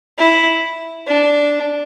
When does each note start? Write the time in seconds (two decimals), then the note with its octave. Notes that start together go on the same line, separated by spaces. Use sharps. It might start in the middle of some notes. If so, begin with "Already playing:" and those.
0.18 E4
1.07 D4